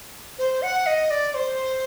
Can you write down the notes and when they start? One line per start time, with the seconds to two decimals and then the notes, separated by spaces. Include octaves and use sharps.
0.39 C5
0.62 F#5
0.86 D#5
1.10 D5
1.34 C5